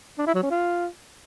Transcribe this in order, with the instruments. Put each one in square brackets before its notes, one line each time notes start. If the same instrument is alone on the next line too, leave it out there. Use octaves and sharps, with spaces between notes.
[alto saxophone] D4
E4
F#3
C#4
F4